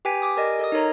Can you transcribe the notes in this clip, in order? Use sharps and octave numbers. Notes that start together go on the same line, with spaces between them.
G4 B4 G5 G#5 B6
G#5 D6 D#6
G4 A#4 D5 D#5
A4 D#5 D#6
D#4 A4 A#4 C#5 A#5